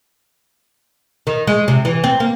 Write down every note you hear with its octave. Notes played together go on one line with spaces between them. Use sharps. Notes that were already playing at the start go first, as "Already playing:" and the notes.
D#3
G#3
C3
E3
C4
A#3